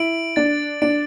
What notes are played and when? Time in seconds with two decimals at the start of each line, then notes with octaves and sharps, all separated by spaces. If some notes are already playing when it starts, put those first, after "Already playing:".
Already playing: E4 D7 F#7
0.36 D4 A6
0.82 D4 D7